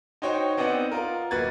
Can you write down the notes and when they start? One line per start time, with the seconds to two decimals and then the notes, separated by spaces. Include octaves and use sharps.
0.22 D#4 F#4 C5 C#5 G5
0.57 B3 C4 D#4 D5 F#5
0.92 F4 A#4
1.31 D1 A#3 F#4 B4 G#6 A6